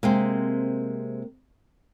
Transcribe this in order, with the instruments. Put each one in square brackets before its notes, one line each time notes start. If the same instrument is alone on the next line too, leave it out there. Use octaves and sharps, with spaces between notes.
[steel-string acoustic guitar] C3 G#3 [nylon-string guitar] A#3 C4